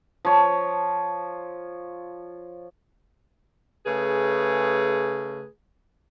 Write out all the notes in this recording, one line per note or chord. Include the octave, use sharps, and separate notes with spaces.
F3 C#5
C#3 A3 G#4 B4